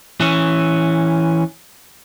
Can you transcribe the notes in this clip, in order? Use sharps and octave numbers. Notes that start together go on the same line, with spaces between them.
E3 C#4